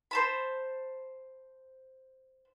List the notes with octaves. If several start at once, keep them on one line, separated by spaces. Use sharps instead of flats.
C5 A5 B5